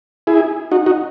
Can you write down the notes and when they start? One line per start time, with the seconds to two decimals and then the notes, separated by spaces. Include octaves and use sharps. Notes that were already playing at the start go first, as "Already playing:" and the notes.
0.27 E4 G#4
0.71 D#4 F#4
0.86 D#4 F#4